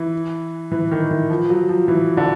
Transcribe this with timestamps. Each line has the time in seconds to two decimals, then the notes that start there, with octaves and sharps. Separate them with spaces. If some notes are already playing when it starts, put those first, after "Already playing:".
Already playing: E3
0.72 E3
0.91 D#3
1.11 E3
1.30 F3
1.50 F#3
1.69 F3
1.88 E3
2.17 D3